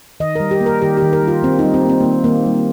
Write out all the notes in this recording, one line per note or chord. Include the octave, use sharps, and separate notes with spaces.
D#3 D#5
G3 A#4
G4
A#3
A#4
D#3 G4
D#3 G4
A#4
G3
F4
D#3 C4
G3 D#4
C4
A#3 C4
D#3 A#3
D#3 A#3
G3